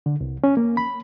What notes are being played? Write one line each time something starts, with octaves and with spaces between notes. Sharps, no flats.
D3
C2
C#4
A#3
B5